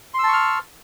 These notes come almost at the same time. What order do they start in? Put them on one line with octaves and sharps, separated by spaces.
C6 E6 A5 C#6 F6